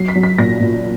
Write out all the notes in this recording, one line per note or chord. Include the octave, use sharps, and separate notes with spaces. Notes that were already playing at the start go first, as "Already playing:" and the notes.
Already playing: F#3 C7
B6
F#3
B6
A#2 A#6
A#2